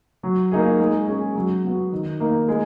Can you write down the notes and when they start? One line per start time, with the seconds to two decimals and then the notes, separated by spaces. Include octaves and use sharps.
0.23 F#3
0.51 A#3 D#4 G#4
0.80 G#3
1.07 C#4 G#4
1.35 F#3
1.64 B3 F#4
1.92 D#3
2.20 A#3 D#4
2.48 G#3